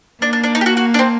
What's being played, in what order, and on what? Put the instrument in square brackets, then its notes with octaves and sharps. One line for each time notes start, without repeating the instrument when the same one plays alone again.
[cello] A#3 [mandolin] D4
[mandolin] D4
D4
D#4
G4
F#4
F#4
D4
C4